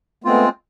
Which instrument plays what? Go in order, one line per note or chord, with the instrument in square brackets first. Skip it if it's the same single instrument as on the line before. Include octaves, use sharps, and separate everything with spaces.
[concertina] G#3 C4 F4 [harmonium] A3 B3